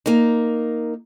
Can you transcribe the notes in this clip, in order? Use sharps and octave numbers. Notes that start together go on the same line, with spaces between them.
A#3 D#4